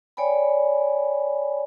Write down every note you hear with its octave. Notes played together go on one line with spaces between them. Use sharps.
C#5 D5 G5 G#5 B5